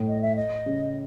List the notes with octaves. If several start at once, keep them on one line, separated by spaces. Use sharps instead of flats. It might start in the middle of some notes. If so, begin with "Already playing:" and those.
Already playing: A2
D#5
E5
D#5
C#3